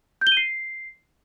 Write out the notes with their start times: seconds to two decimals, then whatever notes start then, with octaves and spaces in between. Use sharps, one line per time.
0.21 G6
0.27 G7
0.32 D#7
0.37 C7